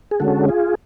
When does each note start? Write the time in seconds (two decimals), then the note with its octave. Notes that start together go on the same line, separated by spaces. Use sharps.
0.11 G#4
0.20 D3 G#3 C#4 F#4 A4
0.48 F4 G#4